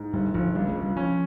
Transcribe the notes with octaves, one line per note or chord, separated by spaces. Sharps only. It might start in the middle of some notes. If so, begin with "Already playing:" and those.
Already playing: G#2
G1 G3
G1 F3
C#2 G3
G#3
C#2
G3
F3 C#4